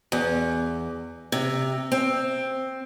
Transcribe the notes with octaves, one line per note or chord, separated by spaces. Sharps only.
E2
C3
C4